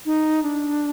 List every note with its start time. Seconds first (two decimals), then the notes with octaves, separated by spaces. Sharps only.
0.06 D#4
0.43 D4